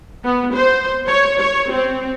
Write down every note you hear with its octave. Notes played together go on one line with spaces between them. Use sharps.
B3
C5
C#5
C#5
C4